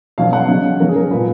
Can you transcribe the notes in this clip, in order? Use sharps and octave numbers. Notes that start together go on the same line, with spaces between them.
B2 F#3 F5
F#5
C#3 F#3
C#3 F#3 A#4
G#4
A#4
A#2 F3 B4